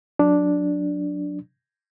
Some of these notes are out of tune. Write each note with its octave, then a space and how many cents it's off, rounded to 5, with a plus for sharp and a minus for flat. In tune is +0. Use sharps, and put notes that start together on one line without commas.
F#3 -20 D4 +0